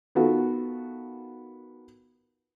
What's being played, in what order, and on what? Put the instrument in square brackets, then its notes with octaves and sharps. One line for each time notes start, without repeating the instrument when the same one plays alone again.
[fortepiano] D#3 B3 F4 F#4 A4